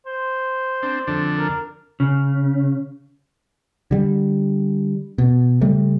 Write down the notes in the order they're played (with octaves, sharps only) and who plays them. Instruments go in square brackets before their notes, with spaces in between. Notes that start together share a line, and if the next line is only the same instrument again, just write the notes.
[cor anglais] C5
[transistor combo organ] C4 D4
F2 D3 D4
[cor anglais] A#4
[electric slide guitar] C#3
[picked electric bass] D3 G3
B2
C#3 G3 A3